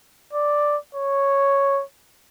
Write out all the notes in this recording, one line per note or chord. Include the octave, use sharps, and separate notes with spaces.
D5
C#5